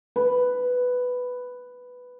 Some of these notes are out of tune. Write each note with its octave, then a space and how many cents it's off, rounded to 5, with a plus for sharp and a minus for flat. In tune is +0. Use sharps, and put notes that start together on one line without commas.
B4 +5